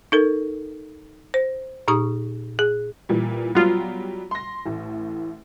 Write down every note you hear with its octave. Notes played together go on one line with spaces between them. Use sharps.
D#4 A4 A#4
C5
A#2 D#4 G4 C#6 D#6
G#4
A#2 E3 G3
F#3 G3 B3 F4
C6 A#6
A1 A2